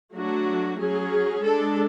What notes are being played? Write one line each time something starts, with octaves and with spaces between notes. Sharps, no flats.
F#3 A3 D4 F#4
F#3 C#4 G#4
G#3 D4 A4